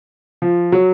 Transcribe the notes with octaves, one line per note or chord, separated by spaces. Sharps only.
F3
F#3